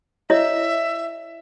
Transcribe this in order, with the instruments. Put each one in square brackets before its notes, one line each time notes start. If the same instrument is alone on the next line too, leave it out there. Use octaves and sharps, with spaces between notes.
[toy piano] E4 C#5 D#5 [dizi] E5